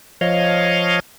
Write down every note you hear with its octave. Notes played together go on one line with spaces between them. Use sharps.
F3 C#5 D#5 F5